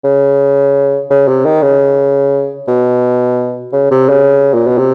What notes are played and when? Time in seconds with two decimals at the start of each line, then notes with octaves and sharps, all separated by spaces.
0.04 C#3
1.10 C#3
1.28 C3
1.45 D#3
1.62 C#3
2.68 B2
3.73 C#3
3.91 C3
4.09 C#3
4.54 A#2
4.67 B2
4.78 C3